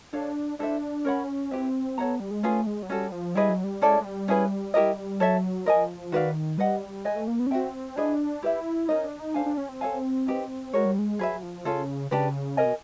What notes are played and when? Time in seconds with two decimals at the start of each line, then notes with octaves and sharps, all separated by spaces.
0.13 D4 A4 C#5 F5
0.59 D4 E4 A4 C5 E5
1.05 C#4 A#4 C#5 F#5 B5
1.51 C4 E4 G4 B4 E5
1.98 B3 A4 C#5 F#5 A#5
2.20 G3
2.31 G#3
2.43 A3 C#4 F4 G#4 B4
2.67 G#3
2.83 F#3
2.89 G3 C#4 F#4 A4
3.12 F3
3.35 G3 E4 G#4 B4 D#5
3.49 F#3
3.64 G3
3.82 G#3 C#4 E4 A4 D5
4.00 G#3
4.05 G3
4.28 C#4 E4 G#4 B4
4.74 E4 G4 A#4 D#5
5.20 F#3 A4 C#5 E5
5.65 F3 A#4 D#5 G#5
6.12 D#3 F#4 B4 D5 F5
6.58 G3 B4 D#5 F#5
7.05 G#3 B4 D#5 G#5
7.16 A3
7.28 A#3
7.40 B3
7.47 C#4
7.50 C4 F#4 B4 E5 G5
7.96 D4 E4 G#4 B4 D#5
8.43 E4 G4 B4 E5
8.88 C#4 D#4 F4 A#4 D#5
9.04 D4
9.20 D#4
9.34 D4 A4 C5 F5 G#5
9.46 D4
9.57 C#4
9.69 C4
9.81 A4 C#5 F5 G#5
10.27 D#4 G4 B4
10.73 G#3 F#4 A#4 C#5
10.85 G3
10.99 G#3
11.19 F#3 G#4 B4 E5
11.43 F3
11.65 C#3 C#4 F4 A4
12.11 C#3 D4 G4 B4
12.57 C3 A#4 D#5 G#5
12.65 B2